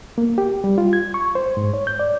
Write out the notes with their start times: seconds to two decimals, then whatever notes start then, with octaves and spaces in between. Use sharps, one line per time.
0.18 A#3
0.38 G4
0.64 G3
0.78 F4
0.93 G#6
1.14 C#6
1.35 C5
1.57 G#2
1.74 C#5
1.87 G6
1.99 D5